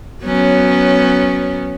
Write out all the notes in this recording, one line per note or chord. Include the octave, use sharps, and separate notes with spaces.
F#3 B3 C#4